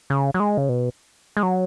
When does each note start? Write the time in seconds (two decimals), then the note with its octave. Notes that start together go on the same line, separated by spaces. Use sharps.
0.10 C#3
0.34 F#3
0.40 G#3
0.57 C#3
0.69 B2
1.37 G#3
1.43 F#3